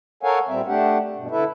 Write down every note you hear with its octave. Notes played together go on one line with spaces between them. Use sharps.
A4 A#4 C#5 F5 F#5 G#5
A#2 G3 C4 E5
A3 D4 G4 F#5
G2 B2
D3 E4 A4 B4 E5